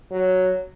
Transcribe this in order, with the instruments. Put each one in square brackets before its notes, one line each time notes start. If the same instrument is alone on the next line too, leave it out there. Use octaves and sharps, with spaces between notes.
[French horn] F#3